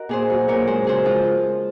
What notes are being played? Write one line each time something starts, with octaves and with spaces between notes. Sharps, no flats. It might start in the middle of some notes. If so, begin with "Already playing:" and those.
Already playing: F#4 A#4 D#5
A#2 G#4 C5
F#3
A#2 A#4 C#5
G#3 G#4 C5
C#3 G#4 C5
F3 G#3 F4